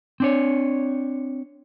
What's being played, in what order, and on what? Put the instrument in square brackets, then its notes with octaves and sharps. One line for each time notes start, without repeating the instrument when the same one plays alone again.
[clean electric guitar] C4 D4 C#5